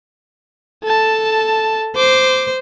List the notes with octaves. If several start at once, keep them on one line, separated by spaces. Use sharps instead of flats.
A4 A5
C5 D6